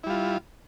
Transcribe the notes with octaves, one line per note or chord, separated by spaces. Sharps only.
G3 E4 F4